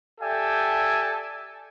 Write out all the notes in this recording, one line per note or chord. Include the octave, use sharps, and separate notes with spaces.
G4 A4 D5 E5 G5 G#5